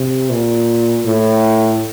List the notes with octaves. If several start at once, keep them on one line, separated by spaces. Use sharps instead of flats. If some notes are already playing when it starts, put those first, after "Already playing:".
Already playing: C3
A#2
A2